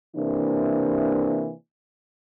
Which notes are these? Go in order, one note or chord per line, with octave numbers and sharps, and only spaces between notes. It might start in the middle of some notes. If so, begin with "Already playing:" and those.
C3 E3 A#3 D4